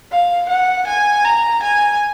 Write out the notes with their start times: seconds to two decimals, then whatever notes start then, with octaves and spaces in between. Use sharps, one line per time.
0.12 F5
0.49 F#5
0.88 G#5
1.25 A#5
1.63 G#5